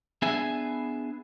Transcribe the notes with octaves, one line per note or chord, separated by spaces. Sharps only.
B3 D4 G#4 E5 G#5